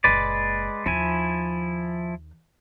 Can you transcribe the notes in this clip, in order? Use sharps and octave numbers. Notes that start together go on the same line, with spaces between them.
F#1 A#2 G#3 B4 D5
D#2 D#3 F3 E4 G#5